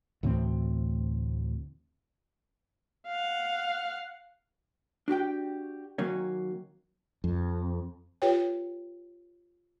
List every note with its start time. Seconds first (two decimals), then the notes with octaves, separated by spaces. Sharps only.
0.23 D2 A2 E3 C4
3.07 F5 F#5
5.08 D4 F#4 G4 G5
5.98 D#3 F#3 A#3 C#4 C#5
7.24 F2
8.22 F4 G4 B4 C#5 G5